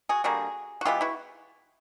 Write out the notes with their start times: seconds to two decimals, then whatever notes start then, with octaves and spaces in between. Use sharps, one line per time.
0.09 F#4 G#4
0.24 D3 G3 A#3 F#4 G#4
0.81 F#4
0.85 E3 G#3 B3 F4 G4
1.01 E4 F#4